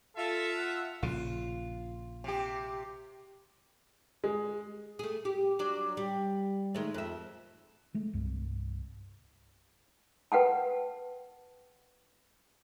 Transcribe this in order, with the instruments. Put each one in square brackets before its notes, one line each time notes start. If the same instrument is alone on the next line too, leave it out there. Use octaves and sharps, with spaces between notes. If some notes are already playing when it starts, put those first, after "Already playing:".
[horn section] F4 E5 [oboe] A4
[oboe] F#5
[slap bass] A#1 C#3 [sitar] F4
[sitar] C3 G4
[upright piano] G#3
[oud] A3 G#4
G4
F#3 D4 D5
G3
D#3 G#3 A3
F2 E5
[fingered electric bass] G#3 A3
C2 G2
[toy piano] B4 F#5 G5 A5